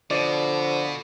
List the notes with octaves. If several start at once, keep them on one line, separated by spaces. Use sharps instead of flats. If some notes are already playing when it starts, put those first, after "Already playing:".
B2 D3 F3 D5